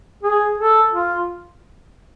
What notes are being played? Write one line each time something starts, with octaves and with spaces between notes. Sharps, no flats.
G#4
A4
F4